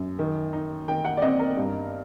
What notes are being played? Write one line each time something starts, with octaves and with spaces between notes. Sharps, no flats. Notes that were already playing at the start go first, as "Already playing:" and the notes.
Already playing: F#2
D#3
D#4
D#3 G5
F#5
D5
C4 D#5
A#4
G2